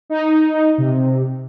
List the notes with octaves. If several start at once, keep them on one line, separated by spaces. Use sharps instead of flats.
D#4
C3